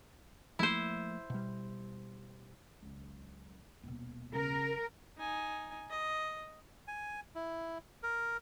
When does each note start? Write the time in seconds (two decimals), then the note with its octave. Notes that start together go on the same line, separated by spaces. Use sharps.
0.59 F3 A3 A#3 E4 C5
1.30 B2 G3
2.82 C#2 F#3
3.83 D#1 B2
4.33 C#3 A#4
5.18 D#4 G#5
5.90 D#5
6.88 G#5
7.35 E4
8.03 A#4